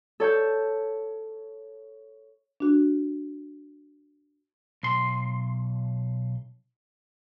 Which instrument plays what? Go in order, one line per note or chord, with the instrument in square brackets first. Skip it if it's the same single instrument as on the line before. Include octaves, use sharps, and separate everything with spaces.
[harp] A4 C#5 A5 G6
[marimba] D4 F#4
[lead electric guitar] B1 C6